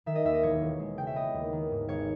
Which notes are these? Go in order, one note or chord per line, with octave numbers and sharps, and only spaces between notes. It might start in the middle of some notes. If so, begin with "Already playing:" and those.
D#3 E5
D#5
D#2 E5
D#5
E1 C#5
E1
G#3
C#3 G5
E5
B3 D#5
D#2
D#3
G#2
G#1 C#5